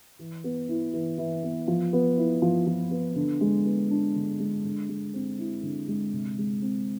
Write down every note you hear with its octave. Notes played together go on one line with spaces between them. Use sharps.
E3
B3
E4
E3
E3
B3
F3
B3
E4
F3
F3
B3
D3
G#3
B3
D4
D3
G#3
D3
G#3
C4
E4
D3
G#3
C3
G#3
C4